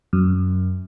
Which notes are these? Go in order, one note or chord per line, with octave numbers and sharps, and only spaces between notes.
F#2